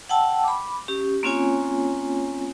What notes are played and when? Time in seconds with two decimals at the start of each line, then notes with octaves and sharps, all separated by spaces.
0.09 F#5 G5 A5 E6
0.44 B5 D6
0.88 C#4 G4
1.23 A#3 C4 C#4 F4 C#5 G#5